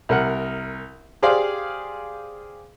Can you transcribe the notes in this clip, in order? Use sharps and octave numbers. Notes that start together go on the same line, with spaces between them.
C2 A#4 F#5
G4 G#4 C5 D5 F5